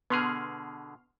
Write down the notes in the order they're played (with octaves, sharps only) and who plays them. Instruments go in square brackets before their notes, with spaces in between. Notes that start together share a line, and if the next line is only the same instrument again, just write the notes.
[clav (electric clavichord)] B2 D3 G#4 [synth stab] B3 C6 F6